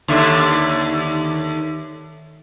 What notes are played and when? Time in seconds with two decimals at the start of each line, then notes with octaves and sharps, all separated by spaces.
0.08 D#2 D3 E5